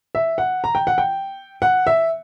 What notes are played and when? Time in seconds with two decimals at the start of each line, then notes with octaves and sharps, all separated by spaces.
0.15 E5
0.38 F#5
0.64 A#5
0.75 G5
0.87 F#5
0.98 G5
1.62 F#5
1.87 E5